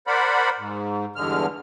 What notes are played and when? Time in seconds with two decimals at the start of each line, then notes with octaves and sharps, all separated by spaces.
0.07 A#4 C5 D5 F#5 B5
0.58 G#2
1.16 E2 G2 D3 G#3 F6